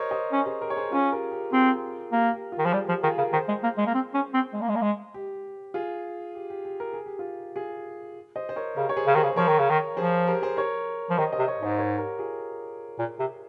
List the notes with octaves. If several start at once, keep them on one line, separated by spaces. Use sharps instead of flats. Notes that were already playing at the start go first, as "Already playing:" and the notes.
Already playing: A#4 C5 C#5 D#5
C5 D#5
C#4
G#4 C5
G4 A#4
C#5
G#4 C5
C#4 F4 G#4
G4 A#4
G4
C4 F4 G#4
A#3 G4 A#4
G4
F4
D#3
F3 G#4
G3 G4
F3 G4
D#3 F4 G#4
C#3 G4 A#4
D#3 G#4 C5
G#3
A#3
G#3
A#3
C4
C#4
C4
G#3
A#3
G#3
A#3
G#3
G4
F4 G#4
G4
G4
G4
A#4
G#4
G4
F4 G#4
F4 G#4
C5 D#5
C5
A#4 C#5
C#3 G4 A#4
C#5
G#4 C5
C#3
D#3 G#4 C5
C#3
C5
F3 A#4 C#5
D#3
C#3
D#3
F3 G#4 C5
G4 A#4
G#4 C5
A#4 C#5
F3
D#3 C5 D#5
C5 D#5
C3
A#4 C#5
G#2 C5 D#5
A#4 C#5
G4 A#4
F4 G#4
A#2
C3